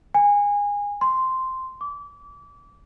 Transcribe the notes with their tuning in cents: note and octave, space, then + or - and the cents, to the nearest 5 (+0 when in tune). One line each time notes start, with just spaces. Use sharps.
G#5 -25
C6 -5
D6 -30